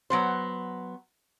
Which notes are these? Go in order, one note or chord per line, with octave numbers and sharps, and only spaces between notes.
F#3 B3 C5